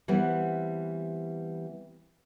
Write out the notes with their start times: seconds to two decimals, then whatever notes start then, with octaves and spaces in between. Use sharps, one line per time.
0.08 E3 G3 B3 C4